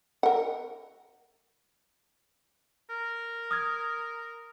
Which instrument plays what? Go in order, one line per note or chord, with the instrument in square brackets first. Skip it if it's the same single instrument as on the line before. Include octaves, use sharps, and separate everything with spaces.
[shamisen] A#4 F#5
[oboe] A#4
[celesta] D#6 F6 G#6